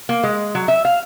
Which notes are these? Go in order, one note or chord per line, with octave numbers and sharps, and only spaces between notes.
A#3
G#3
F#3
E5
F5